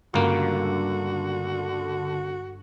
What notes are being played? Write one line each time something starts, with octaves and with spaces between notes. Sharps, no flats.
C#2 G2 D3 A#3 F#4